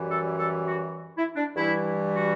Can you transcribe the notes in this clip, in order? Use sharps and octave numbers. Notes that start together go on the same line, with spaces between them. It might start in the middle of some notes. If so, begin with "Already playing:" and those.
Already playing: F#2 E3 G3
A4
A4
F#4
E4
D4
G2 E3 G3 E4
F#4